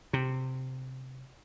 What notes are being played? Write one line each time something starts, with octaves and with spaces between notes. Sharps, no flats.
C3